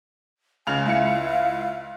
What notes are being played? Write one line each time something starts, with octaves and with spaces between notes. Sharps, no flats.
C#2 C#3 G#5 F7
C#2 E4 F5 C#7